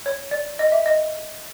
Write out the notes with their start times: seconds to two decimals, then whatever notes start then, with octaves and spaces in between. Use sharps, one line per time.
0.06 C#5
0.31 D5
0.59 D#5
0.72 E5
0.86 D#5